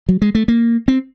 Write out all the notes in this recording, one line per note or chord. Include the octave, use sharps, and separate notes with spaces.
F#3
G#3
A3
A#3
C4